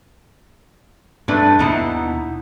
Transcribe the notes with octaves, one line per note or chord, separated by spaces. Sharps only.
G2 A3 D4 B4
D#2 B2 B3 D#4 E4